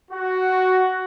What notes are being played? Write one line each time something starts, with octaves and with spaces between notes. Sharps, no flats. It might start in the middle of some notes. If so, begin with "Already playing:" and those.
F#4